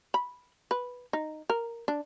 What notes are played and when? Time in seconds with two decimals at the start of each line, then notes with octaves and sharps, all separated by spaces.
0.14 B5
0.71 B4
1.13 D#4
1.50 A#4
1.88 D4